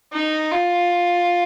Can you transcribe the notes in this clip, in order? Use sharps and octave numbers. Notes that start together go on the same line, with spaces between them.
D#4
F4